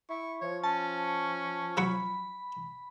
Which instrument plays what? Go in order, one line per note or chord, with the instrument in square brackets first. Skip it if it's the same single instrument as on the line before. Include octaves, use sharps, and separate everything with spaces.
[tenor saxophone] E4 [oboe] C#6
[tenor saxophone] F3 [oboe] C#5
[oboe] C#4 [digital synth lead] A5
[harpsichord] F#3 F#5 C#6 [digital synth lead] B5